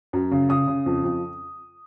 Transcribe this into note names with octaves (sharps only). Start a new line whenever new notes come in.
F#2
C#3
C#3 D#6
C#3
F2
F2